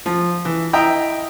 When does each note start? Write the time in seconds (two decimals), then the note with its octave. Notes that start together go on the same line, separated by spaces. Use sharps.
0.06 F3
0.45 E3
0.73 E4 D#5 G5 A#5 D#6